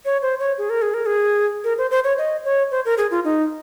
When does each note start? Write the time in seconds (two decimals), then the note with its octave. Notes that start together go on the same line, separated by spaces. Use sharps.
0.05 C#5
0.22 C5
0.40 C#5
0.58 G#4
0.70 A#4
0.82 G#4
0.94 A#4
1.06 G#4
1.64 A#4
1.78 C5
1.91 C5
2.04 C#5
2.18 D#5
2.45 C#5
2.71 C5
2.85 A#4
2.98 G#4
3.11 F4
3.25 D#4